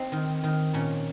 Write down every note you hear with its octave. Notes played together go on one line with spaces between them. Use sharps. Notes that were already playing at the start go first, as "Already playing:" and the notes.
Already playing: C4 D#4
D#3
D#3
A#2 C#4